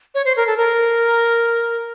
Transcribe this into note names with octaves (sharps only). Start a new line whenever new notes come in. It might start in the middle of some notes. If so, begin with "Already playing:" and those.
C#5
C5
A#4
A4
A#4